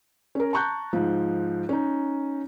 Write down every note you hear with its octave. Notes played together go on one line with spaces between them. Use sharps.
C#4 A#4
A5 A#5 C#6 F#6 G6
G#2 F3
C#4 D#4